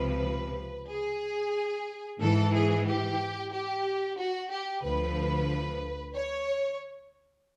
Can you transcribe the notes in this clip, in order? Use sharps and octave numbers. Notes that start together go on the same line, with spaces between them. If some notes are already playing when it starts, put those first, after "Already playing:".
Already playing: C#2 C3 F3 B4
G#4
G#2 E3 A4
G#4
G4
G4
F#4
G4
D2 D3 F3 B4
C#5